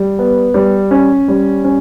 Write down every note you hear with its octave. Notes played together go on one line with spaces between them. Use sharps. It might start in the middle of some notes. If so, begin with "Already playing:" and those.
Already playing: G3
B3
G3
C#4
G3
C#4